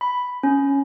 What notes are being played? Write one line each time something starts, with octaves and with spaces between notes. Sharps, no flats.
B5
C#4